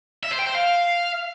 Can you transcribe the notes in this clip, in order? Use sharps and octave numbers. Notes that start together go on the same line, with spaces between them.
E5
C5
G5
C5
F5